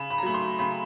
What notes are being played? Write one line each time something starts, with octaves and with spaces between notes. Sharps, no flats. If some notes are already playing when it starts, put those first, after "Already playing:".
Already playing: C#3 B5
B5
A#5
F#3 A3 B5
C6
C#3 B5